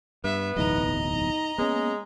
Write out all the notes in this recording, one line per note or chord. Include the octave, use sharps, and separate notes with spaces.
G2 B3 E5
D1 B1 E2 D#4 D#5 A#5
G#3 A#3 B3 C#4